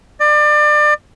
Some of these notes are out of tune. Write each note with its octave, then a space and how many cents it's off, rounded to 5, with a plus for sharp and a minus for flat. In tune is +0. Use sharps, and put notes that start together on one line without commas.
D5 +30